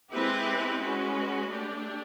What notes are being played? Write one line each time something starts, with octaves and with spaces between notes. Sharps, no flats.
G#3 C4 E4 G4 B4
G#3 C#4 F#4 B4
A3 D4 G4